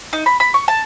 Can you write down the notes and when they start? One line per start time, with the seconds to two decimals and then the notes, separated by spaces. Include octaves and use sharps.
0.13 D#4
0.26 B5
0.40 B5
0.54 C#6
0.68 A5